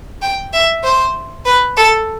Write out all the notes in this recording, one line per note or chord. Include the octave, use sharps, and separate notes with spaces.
G5
E5
C5
B4
A4